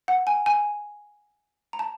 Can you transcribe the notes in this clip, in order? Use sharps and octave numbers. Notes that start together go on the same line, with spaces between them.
F#5
G#5
G#5
A#5
A5